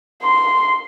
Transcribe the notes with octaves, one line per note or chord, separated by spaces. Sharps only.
C6